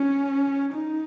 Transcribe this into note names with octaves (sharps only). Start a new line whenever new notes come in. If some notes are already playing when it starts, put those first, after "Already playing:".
Already playing: C#4
D#4